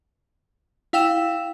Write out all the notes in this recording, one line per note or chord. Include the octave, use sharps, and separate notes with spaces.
E4 F5 G5 E6 E7